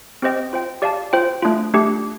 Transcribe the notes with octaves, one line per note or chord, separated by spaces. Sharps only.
C4 G4 C5 D#5 G5
F4 C5 G5
G4 D5 F5 A5
F4 C5 G5
A3 D4 F4
A3 D4 G4